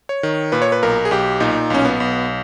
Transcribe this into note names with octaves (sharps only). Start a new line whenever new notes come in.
C#5
D#3
A#2 B4
C#5
B4
B1 A#4
G#4
B1 G4
A#2 D#4
B1 C#4
B3
B1